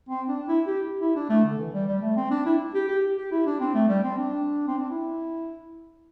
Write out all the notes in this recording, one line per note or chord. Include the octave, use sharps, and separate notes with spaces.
C4
D4
E4
G4
E4
D4
A3
D3
E3
G3
G3
A3
C4
D4
E4
G4
G4
G4
E4
D4
C4
A3
G3
C4
D4
C4
D4
E4